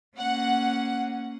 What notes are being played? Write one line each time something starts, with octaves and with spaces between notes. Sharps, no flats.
A#3 C#4 F#5